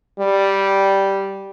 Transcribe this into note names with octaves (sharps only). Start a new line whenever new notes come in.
G3